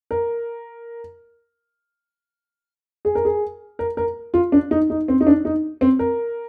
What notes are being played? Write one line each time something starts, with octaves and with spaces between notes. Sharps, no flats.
A#4
G#4
A#4
G#4
A#4
A#4
F4
D4
D#4
D#4
C4
D#4
D4
D#4
C4
A#4